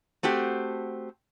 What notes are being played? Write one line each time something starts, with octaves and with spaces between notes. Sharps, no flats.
A3 C4 F#4 G4